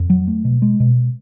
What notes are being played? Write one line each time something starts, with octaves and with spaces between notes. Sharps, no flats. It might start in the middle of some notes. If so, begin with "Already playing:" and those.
Already playing: F2
F#3
A3
B2
G#3
B2